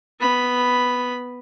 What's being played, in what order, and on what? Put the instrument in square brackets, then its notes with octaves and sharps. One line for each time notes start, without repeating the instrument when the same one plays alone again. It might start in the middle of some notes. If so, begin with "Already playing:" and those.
[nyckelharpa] B3 B5